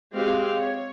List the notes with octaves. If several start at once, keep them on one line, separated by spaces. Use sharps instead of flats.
G#3 C4 F#4 G4 F5
C#5